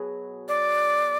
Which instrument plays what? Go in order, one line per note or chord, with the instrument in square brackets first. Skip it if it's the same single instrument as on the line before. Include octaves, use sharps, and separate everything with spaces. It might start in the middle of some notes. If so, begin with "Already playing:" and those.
Already playing: [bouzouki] B2 F#3 G#4
[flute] D5